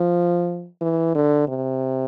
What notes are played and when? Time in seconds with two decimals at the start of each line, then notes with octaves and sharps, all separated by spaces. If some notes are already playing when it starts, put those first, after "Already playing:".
Already playing: F3
0.81 E3
1.15 D3
1.48 C3